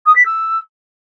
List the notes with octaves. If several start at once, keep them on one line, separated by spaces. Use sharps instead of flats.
D#6
B6
E6